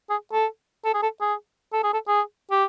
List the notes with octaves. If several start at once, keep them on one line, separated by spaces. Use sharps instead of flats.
G#4
A4
A4
G#4
A4
G#4
A4
G#4
A4
G#4
G4